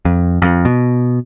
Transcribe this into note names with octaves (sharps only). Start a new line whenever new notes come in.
F2
F2
B2